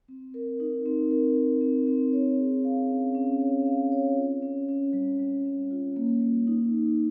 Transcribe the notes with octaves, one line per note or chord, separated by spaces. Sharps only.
C4
A#4
D#4
C4
A#4
A#4
C4
C4
C#5
G#4
F5
C#4
C#4
C#5
F5
C#5
F4
C#4
C#4
G3
G3
C#4
F4
A#3
A#3
D#4
A#3